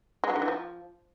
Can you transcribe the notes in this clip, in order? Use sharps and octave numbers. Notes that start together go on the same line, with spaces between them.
G#3
F#3
D3
E3
F3